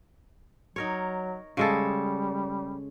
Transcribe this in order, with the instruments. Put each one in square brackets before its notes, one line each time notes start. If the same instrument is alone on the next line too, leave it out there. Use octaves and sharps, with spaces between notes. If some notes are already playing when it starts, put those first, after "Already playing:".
[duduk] F#3 [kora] D#4 A#4 C#5
[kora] C#3 G#3 A4 [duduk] G3